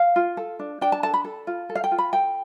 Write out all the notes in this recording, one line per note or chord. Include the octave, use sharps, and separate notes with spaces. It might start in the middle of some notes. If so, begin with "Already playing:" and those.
Already playing: F5
F4
A4
D4
D4 G5
A5
A4 A5
B5
A4
F4
A4
F5
G5
F4
B5
A4 G5